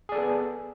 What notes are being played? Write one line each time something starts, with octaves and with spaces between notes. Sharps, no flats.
B3 G#4 A4 D5